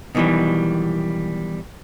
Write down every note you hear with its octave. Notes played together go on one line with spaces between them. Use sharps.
B2 D#3 E3 F#3 G3